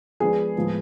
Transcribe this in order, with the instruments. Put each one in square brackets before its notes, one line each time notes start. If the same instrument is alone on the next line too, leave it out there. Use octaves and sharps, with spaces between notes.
[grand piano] F3 G#3 B3 D4 [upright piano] G#4
[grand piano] A2 F3 G#3 B3